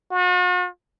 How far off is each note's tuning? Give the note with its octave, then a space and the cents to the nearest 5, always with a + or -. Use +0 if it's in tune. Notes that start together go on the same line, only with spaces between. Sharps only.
F#4 -45